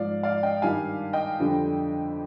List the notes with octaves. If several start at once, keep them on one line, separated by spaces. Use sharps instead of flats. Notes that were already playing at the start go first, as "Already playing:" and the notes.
Already playing: G#2 F3 D5 F5
D5 F5
D#5 G5
G2 D#3 G3 F5 G#5
D#5 G5
F2 D3 G3